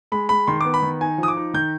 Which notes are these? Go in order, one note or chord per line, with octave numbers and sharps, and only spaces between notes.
G#3 B5
G#3 B5
D#3 C6
B3 D6
B5
D#3
D#4 G#5
F3
D#6
D6
D#4
D#3 G6